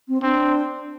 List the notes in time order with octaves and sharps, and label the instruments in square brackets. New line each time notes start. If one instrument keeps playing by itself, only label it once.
[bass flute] C4
[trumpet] C4 [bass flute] D4